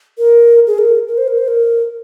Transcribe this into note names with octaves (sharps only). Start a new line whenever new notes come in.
A#4
G#4
A#4
A#4
C5
A#4
C5
A#4